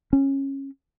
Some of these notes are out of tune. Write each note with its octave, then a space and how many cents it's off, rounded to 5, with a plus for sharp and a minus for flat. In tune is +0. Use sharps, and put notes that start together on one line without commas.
C#4 -20